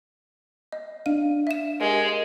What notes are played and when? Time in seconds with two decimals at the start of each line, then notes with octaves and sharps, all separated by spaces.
0.72 D#5
1.06 D4 F5 D#7
1.47 E5 E7
1.81 G#3 G4 A#4